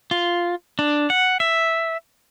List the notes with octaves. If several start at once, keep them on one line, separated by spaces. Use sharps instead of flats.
F4
D4
F#5
E5